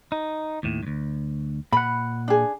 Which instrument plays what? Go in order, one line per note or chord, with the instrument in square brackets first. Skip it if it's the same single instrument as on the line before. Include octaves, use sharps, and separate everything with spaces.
[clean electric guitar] D#4
D#2 A2
D2 G2
[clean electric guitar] A#2 F#5 [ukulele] B5
[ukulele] D4 G#4